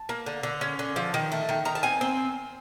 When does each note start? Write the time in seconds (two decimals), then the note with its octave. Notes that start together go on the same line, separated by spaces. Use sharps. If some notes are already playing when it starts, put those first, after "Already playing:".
Already playing: A5
0.09 A#3
0.26 D3
0.43 D3
0.61 C#4
0.79 D3
0.96 F3
1.14 D#3
1.32 A3
1.49 D#3
1.65 D#3 A#5
1.75 A5
1.83 C4 G#5
2.01 C4